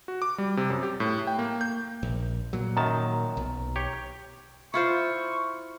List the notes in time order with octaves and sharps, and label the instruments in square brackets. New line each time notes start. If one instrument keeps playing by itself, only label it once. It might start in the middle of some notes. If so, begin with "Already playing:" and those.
[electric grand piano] F#4
D6
G3
C3
F#2
G4
A2
G5
A#3
G6
[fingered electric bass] A#1
A#2 F#3
[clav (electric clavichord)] F#2 D#3 A5 [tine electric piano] A#5
[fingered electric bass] B1
[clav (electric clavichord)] G4 C#5
[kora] E4 F4 C5 [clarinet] C#6